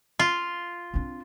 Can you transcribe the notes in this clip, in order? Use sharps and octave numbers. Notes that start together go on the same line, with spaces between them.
F4
C4 D4